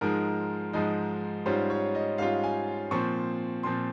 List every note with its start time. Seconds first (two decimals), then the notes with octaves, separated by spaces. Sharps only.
0.01 G#2 F3 G#3 D#4 A#4
0.73 G#2 F3 G#3 D#4
1.46 G#2 G3 C#4 F4 C5
1.70 C#5
1.95 D#5
2.18 G#2 G3 C#4 F4 F5
2.44 G#5
2.91 A#2 F3 C4 C#6
3.63 A#2 F3 C4 C6